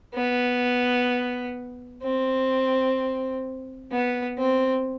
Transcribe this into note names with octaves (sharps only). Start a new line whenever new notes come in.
B3
C4
B3
C4